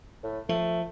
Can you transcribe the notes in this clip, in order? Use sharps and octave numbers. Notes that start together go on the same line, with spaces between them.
A2
F3 A3